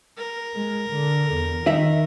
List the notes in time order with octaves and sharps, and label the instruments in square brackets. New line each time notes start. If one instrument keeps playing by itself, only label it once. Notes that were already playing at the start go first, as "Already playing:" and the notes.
[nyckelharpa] A#4
[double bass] G#3
D3
E2
[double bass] D#3 [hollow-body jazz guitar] D#4 E5